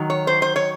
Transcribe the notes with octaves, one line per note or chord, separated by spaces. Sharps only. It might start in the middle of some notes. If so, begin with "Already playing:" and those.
Already playing: D#3 F#3
C#5
C5
C5
C#5